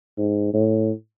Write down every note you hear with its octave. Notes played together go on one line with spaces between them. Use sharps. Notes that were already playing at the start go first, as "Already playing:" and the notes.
G#2
A2